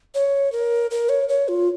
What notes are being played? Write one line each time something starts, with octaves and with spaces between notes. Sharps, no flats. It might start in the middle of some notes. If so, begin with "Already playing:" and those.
C#5
A#4
A#4
C#5
C#5
F4